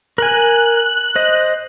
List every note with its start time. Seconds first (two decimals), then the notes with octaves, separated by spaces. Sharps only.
0.18 A#4 G#5 F#6
1.16 C5 D#5